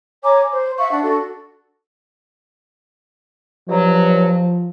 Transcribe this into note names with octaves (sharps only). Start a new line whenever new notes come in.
C#5 G#5 A#5 D6
C5
E5 F5 C#6
D4 F#5
D4 F#4 A4
G2 B2 F3 F#3